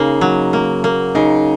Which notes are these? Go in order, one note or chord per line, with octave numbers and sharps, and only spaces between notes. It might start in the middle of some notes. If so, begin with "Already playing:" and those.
Already playing: C#3 A#3 D#4
F#3
A#3
A#3
C#3 D#4